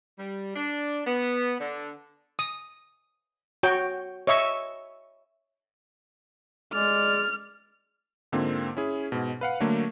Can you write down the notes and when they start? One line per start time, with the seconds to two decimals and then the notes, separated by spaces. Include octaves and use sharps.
0.19 G3
0.56 D4
1.06 B3
1.61 D3
2.39 D#6
3.63 F#4 C#5 G5
4.27 C#5 D#5 E5 C#6
6.74 G#3 D5 F6
8.32 G#2 D3 A#3 C4 F4
8.77 C#4 E4 G#4
9.12 G#2 B2
9.41 B4 F5 F#5
9.60 D3 F#3 A3 A#3